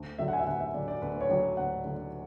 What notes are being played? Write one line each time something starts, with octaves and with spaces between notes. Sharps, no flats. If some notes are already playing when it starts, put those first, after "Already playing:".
Already playing: D2
D3 F#3 E5
F#5
G#5
E5
D2 F#5
E5
D3 F#3 D5
D5
D2 B4
C#5
D3 F#3
D2 F#5
D3 F#3